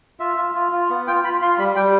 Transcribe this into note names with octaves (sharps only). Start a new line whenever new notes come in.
F4 E5
F4
F4
F4
B3
F4 G5
F4 B5
F4 C6
G3 B5
G3 G5